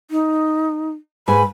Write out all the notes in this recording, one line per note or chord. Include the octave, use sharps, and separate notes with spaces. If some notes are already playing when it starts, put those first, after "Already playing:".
D#4
G#2 B4 G#5 B5